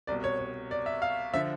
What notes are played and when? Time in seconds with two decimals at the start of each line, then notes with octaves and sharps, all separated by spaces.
0.07 C2 B2 D5
0.24 C#5
0.39 C#5
0.71 D5
0.86 E5
1.02 F5
1.34 D3 F3 E5